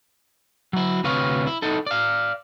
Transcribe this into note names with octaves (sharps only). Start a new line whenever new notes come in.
F#3 E4
D2 C3 B4 C#5 F5
E4
D#4 E4 A4
D5 F5